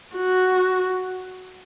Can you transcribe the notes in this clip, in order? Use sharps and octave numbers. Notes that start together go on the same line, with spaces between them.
F#4